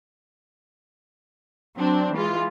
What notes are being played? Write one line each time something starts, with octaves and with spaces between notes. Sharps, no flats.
F#3 C4 D4
E3 G#3 F4